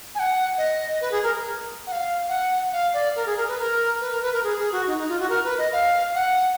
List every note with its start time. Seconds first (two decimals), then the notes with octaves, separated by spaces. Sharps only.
0.15 G#5
0.19 F#5
0.58 D#5
1.01 B4
1.11 G#4
1.23 A#4
1.87 F#5
1.92 F5
2.29 F#5
2.73 F5
2.93 D5
3.16 A#4
3.26 G#4
3.36 A#4
3.48 B4
3.59 A#4
4.01 B4
4.12 A#4
4.22 B4
4.33 A#4
4.44 G#4
4.59 G#4
4.72 F#4
4.87 D#4
4.98 D#4
5.09 F4
5.20 F#4
5.30 A#4
5.44 B4
5.58 D#5
5.72 F5
6.15 F#5